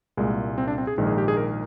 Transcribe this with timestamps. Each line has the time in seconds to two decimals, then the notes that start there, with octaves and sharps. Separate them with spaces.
0.17 C2 A#2 G#3
0.58 C4
0.68 D4
0.78 C4
0.87 G#4
0.98 A#1 G#2 D#3
1.07 G#4
1.18 G4
1.28 G#4
1.37 A#4